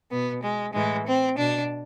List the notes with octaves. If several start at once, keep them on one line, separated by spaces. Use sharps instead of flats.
B2 B3
G#3
A2 E3 G#3
C4
B2 D4